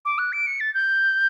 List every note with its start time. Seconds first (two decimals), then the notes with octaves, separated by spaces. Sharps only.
0.05 D6
0.18 F#6
0.33 D7
0.47 C#7
0.60 A6
0.74 G6